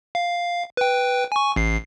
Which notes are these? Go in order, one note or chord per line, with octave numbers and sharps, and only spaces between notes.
F5
B4 G5
G#5 C#6
A1 C7